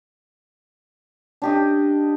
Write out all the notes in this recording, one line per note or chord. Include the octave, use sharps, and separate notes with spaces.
D4 G4 D#5